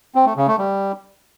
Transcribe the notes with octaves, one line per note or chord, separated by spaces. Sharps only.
C4
A3
C#3
A3
G3